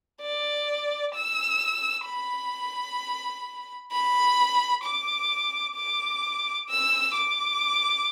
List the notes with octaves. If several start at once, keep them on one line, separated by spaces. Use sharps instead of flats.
D5
E6
B5
B5
D6
D6
E6
D6